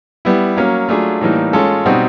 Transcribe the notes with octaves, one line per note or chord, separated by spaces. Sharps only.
G3 B3 E4
F#3 A#3 C#4
F#3 A3 D4 F4 G#4
A2 E3 G3 A#3 D#4
G#3 C#4 F4 A4
B2 G3 C4 D#4 F#4